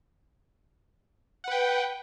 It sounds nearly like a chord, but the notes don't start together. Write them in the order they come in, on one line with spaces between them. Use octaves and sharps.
F#5 B4 G5